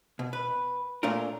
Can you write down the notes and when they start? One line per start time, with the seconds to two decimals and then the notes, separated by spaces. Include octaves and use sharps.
0.19 B2
0.33 B4
1.03 A#2 A3 C#4 D4 F4 A#4